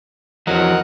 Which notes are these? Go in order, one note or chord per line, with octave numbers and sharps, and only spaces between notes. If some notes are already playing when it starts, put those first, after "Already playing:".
F2 E3 F#3 A#4 D#5 F#5